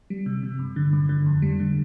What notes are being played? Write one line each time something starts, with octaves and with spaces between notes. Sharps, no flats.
G3
C3
C3
G2
D3
G2
D3
F2
G3
D3